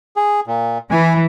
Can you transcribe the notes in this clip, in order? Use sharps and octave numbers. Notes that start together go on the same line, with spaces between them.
G#4
A#2
E3 G#5